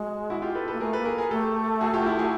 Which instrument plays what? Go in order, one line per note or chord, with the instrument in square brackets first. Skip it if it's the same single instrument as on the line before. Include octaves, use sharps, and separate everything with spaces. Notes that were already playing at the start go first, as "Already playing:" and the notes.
Already playing: [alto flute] G#3 [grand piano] F#4
[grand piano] E4 F#4
F4 G4
A4 B4
A4 B4
[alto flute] A#3
[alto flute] A3 [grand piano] G#4 A#4
[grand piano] A4 B4
[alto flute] A#3
[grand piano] G#4 A#4
G#4 A#4
[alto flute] A3 [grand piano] G4 A4
[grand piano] F#4 G#4
F4 G4
E4 F#4
F#4 G#4